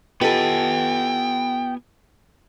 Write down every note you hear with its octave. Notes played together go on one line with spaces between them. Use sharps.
B3 F4 G4 A4 B4 D#5 G5 G#5